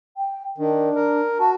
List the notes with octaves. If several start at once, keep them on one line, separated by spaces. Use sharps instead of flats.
G5
D#3 D4
A#4
F#4 A5